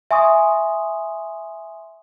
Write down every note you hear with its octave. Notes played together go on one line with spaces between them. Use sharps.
E5 G#5 C6 C#6 D#6